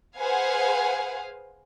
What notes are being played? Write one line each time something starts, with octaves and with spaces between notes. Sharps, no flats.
G#4 B4 C5 F5 F#5 G#5